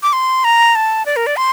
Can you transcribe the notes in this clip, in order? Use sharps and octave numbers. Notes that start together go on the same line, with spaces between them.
D6
C6
A#5
A5
D5
A#4
D5
C6